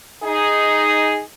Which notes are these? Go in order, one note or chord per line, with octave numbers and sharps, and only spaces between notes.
D#4 G#4